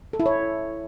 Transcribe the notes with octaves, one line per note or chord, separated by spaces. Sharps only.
A4
E4
C#5